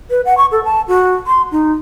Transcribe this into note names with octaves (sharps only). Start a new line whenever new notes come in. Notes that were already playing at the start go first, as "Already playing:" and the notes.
B4
F#5
C#6
A4
A5
F#4
C6
D#4